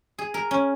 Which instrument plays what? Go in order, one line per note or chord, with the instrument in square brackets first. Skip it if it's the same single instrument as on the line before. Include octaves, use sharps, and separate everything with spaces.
[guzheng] G#4
A#4
C#4